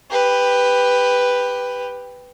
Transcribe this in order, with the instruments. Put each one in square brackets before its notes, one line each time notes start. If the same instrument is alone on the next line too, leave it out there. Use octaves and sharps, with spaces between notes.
[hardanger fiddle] G4 B4